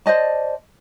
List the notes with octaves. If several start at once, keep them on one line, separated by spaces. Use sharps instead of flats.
C5 D5 D#5 A5